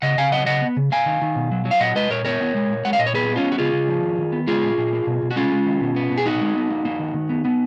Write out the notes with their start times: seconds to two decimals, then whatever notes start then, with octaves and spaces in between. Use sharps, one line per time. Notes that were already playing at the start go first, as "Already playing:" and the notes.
0.02 C#3 D#5 F#5
0.18 C#3 F5 G#5
0.32 F#3 D#5 F#5
0.46 C#3 D#5 F#5
0.62 B3
0.77 C#3
0.92 A#3 F5 G#5
1.06 D#3
1.22 D#3
1.36 B2
1.52 F#3
1.65 F#3
1.71 F5
1.80 A#2 D#5 F#5
1.95 G#3 B4 D#5
2.10 A#2 A#4 C#5
2.25 B3 A#4 C#5
2.41 B3
2.55 G#3
2.69 A#2
2.85 G#3 F#5
2.93 F5
2.99 A#2 D#5
3.06 C#5
3.14 B3 G#4 B4
3.29 B3
3.36 C#4 F4
3.44 B3
3.52 F#4
3.58 C#3 F4 G#4
3.73 C#3
3.88 F3
4.03 D#3
4.18 D#3
4.32 B3
4.48 G#3 F4 G#4
4.63 A#2
4.78 A#2
4.92 A#3
5.07 B2
5.22 B2
5.31 F#4
5.36 G#3 C#4 F4
5.52 G#3
5.66 D#3
5.81 B2
5.96 B3
6.12 B2
6.18 G#4
6.26 A#2 D#4 F#4
6.41 G#3
6.56 B3
6.70 A#3
6.85 A#3
6.99 D#3
7.14 D#3
7.29 B3
7.45 B3